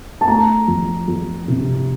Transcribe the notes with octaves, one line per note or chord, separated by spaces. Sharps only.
A5
A3 A#5
F2
F2
C3